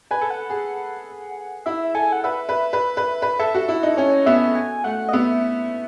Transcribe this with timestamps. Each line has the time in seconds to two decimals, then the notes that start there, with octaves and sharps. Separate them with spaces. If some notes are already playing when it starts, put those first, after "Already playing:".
0.11 B4 G#5
0.21 A4
0.30 F#5
0.50 G#4
1.66 E4 E5
1.95 A4 G#5
2.13 F#5
2.24 B4 E5
2.49 B4
2.73 B4
2.97 B4
3.22 B4
3.39 A4 E5
3.54 F#4
3.68 E4
3.83 D#4
3.97 C#4 C#5
4.26 B3 E5
4.55 G#5
4.84 A3 F#5
5.09 D#5
5.13 B3 E5